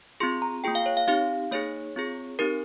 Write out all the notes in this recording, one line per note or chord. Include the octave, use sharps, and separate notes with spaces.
C4 F4 G#4 C6
A#5
A#3 F4 G#4 G5
F5
C#5
F5
C4 D#4 G4 F5
A#3 D#4 G#4 C#5
C4 F4 G#4
C4 D#4 G4 A#4